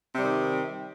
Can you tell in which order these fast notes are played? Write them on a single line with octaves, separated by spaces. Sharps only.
C3 G3 D#3